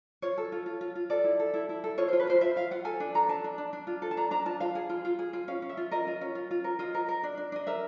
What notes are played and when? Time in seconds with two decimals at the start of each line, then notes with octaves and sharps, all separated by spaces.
0.22 F4 C#5
0.38 A4
0.52 F4
0.66 F4
0.81 F4
0.95 F4
1.10 A4 D5
1.24 E4
1.39 A4
1.54 E4
1.69 E4
1.84 A4
1.98 F4 C#5
2.08 F4 C5
2.19 B4
2.27 F4 C5
2.41 F4 E5
2.56 F4 F5
2.71 F4 F#5
2.85 A4 G#5
3.00 D4
3.15 A4 A#5
3.29 D4 A5
3.44 D4
3.58 D4
3.73 D4
3.87 F4
4.02 A4
4.11 A5
4.17 D4 A#5
4.31 D4 A#5
4.46 F4 A5
4.60 F4 F5
4.75 G#4
4.90 F4
5.05 F4
5.19 G#4
5.33 F4
5.48 C#4 F5
5.62 C#4
5.69 E5
5.77 F4
5.91 A#4 D#5
6.07 F4
6.21 C#4
6.35 F4
6.51 F4
6.64 A#4
6.79 F4 D#5
6.95 A#4
7.09 A#4
7.23 D4
7.37 D4
7.52 D4 D#5
7.67 A#4 E5